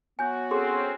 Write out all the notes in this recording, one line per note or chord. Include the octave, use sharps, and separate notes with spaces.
F#3 B3 F#4 G#5 G6
C4 C#4 G#4 A4 C6